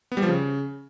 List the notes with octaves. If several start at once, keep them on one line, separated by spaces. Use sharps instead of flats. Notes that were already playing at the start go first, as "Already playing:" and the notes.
B3
G3
F3
C#3